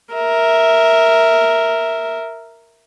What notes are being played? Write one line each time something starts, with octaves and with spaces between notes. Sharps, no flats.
A#4 E5